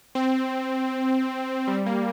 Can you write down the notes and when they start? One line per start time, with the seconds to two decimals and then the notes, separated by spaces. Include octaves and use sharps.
0.15 C4
1.67 G3
1.86 A#3